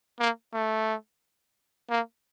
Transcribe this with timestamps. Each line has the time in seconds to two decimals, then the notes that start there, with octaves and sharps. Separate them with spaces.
0.20 A#3
0.54 A3
1.90 A#3